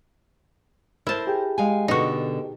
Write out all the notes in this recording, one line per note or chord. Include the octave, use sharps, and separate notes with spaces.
E4 A#4 C5 A5
G4 G#4 G5
G#3 F5 G#5
B2 D3 D#4 F#4